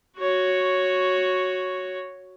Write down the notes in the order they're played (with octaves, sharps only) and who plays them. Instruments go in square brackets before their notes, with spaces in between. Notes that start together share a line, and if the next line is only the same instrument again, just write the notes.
[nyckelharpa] F#4 C#5